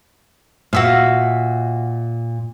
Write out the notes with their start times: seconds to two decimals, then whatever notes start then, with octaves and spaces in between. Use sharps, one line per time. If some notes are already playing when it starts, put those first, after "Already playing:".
0.73 A#2 F#4 E5 F5